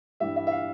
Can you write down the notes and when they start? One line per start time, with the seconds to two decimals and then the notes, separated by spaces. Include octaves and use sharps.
0.20 G2 E3 G3 E5
0.36 E5
0.47 E5
0.52 F5